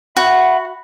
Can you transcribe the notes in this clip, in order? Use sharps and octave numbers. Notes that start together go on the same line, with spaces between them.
F#4 E5 F#5 B5